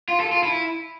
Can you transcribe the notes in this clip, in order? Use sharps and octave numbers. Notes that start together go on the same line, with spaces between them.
F4
A4
F4
E4